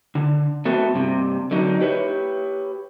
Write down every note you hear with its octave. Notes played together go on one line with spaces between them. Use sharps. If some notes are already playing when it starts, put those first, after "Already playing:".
D3
A3 B3 C4 F#4 A4
G2 C3
D3 F#3 D#4
G4 B4 C#5